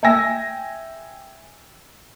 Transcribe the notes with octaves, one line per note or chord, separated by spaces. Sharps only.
E5 G5 G#5 E6 A#6